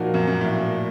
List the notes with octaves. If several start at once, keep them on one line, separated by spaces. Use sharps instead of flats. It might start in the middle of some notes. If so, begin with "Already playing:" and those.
Already playing: A#2 F3 A#3 D#4 F#4
F#2
F#2
A2